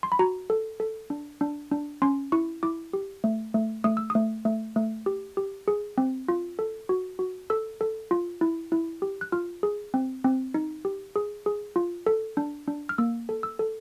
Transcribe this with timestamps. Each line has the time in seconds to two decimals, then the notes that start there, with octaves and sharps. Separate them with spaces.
0.03 C6
0.12 B5
0.19 F#4 A#5
0.50 A4
0.80 A4
1.10 D4
1.41 D4
1.71 D4
2.02 C#4 C6
2.32 E4 C#6
2.63 E4 D6
2.93 G4
3.24 A3
3.54 A3
3.84 A3 D#6
3.97 E6
4.10 D#6
4.15 A3
4.45 A3
4.76 A3
5.06 G4
5.37 G4
5.68 G#4
5.98 C4
6.28 F4
6.59 A4
6.89 F#4
7.19 F#4
7.50 A4 E6
7.81 A4
8.11 F4
8.41 E4
8.72 E4
9.02 G4
9.21 F#6
9.32 F4 F6
9.63 G#4
9.94 C4
10.24 C4
10.54 D#4
10.85 G4
11.16 G#4
11.46 G#4
11.76 F4
12.07 A4
12.37 D4
12.68 D4
12.89 F6
12.98 A#3 E6
13.29 A4
13.43 E6
13.59 A4